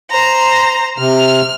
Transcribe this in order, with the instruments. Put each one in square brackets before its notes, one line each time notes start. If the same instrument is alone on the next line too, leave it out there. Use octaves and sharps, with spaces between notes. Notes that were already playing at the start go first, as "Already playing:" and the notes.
[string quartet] C5 A#5
[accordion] C3 [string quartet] F6